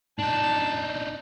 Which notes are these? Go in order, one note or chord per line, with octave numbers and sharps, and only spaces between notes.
D4 D#4 A5